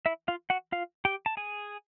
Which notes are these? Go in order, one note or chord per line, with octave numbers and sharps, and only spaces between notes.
E4 E5
F4 F5
F#4 F#5
F4 F5
G4 G5
A5
G#4 G#5